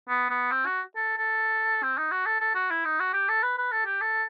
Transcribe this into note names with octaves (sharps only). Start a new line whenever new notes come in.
B3
B3
C4
F#4
A4
A4
C4
D#4
F#4
A4
A4
F#4
E4
D#4
F#4
G4
A4
B4
B4
A4
G4
A4